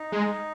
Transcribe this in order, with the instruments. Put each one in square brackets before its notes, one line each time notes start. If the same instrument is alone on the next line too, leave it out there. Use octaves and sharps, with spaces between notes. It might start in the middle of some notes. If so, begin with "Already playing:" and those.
Already playing: [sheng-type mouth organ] D#4
[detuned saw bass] G#3